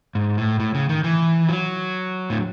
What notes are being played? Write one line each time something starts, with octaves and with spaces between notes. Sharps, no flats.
G#2
A2
A2
C#3
D#3
E3
F#3
A2